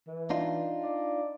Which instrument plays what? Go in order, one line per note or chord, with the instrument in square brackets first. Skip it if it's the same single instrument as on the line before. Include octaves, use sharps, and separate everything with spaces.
[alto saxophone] E3
[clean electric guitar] D4 D#4 F4
[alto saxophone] D5